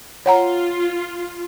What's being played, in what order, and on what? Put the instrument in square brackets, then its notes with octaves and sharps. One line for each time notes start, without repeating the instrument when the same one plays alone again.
[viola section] F4 [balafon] C#5 F#5 A#5